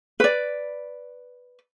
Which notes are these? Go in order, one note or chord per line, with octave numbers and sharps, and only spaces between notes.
B4 D5